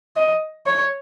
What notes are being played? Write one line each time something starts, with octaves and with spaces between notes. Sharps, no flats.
D#5
C#5